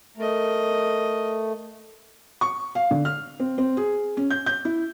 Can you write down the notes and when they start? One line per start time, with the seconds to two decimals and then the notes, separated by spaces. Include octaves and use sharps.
0.17 A3 A#4 D#5
2.41 C#6
2.75 F5
2.91 D3
3.05 F6
3.40 C4
3.58 C4
3.77 G#4
4.17 C#4
4.30 G6
4.46 G6
4.65 E4